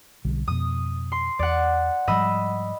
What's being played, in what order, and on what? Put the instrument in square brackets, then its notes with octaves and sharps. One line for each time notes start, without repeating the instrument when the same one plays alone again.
[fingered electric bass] B1 D3 G3
[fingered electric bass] F2 B2 [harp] D#6
[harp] C6
[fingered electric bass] E2 [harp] D5 F#5
[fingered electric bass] G#2 F3 G3 [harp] D#5 B5 E6